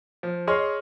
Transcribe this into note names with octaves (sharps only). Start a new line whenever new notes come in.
F3
G#4 C#5 D#5 C6 F6